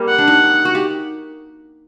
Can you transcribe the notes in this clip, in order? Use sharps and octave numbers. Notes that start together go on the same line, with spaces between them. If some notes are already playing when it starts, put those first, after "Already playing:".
Already playing: G3 A#3
F#5
D4
D#4
F#4
G4